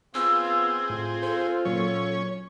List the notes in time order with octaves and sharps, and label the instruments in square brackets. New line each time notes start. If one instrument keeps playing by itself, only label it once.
[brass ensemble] B3 F4 [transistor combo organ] C4 G#4 [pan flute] E6
[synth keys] A2 [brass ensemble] F4
[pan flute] A4 [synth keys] C5
[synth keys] A#2 F#3 [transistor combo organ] C#4 C#5